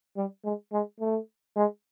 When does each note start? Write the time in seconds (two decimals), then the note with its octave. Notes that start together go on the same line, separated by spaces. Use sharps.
0.17 G3
0.44 G#3
0.72 G#3
1.00 A3
1.56 G#3